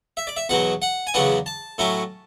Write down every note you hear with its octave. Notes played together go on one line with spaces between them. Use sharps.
E5
D5
E5
E2 B2 F#3 F#5
F#5
G#5
E2 C#3 F#3 B3 D4 F#5
A5
A2 F#3 C#4 E4